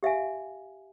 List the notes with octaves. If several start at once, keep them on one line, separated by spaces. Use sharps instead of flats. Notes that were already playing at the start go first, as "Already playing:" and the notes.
G4 E5 F5 G#5